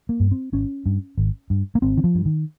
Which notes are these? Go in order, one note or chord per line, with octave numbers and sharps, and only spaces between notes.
A#3
G2
C4
G#1 C#4
G2
G#1
G2
A#3
G#1 C4
D#3
F3
G2
D#3